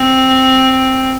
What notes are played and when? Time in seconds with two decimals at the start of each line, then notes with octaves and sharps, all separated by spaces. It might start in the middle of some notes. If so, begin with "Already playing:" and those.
Already playing: C4